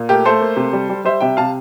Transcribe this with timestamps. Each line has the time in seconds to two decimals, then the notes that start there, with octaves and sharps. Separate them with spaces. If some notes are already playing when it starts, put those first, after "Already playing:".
Already playing: A#2
0.09 A3 G4 A#4
0.25 A3 A4 C5
0.41 A#3
0.57 C3
0.73 G3
0.90 G3
1.05 G3 C5 E5
1.21 C3 E5 G5
1.37 C3 F5 A5